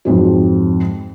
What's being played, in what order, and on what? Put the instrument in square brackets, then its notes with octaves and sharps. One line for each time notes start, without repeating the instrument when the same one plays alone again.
[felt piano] F2 G#2 F#3